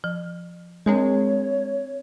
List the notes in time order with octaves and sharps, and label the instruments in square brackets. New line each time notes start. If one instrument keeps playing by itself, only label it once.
[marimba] F3
[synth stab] G#3 [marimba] C4 D4 A#4 [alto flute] C#5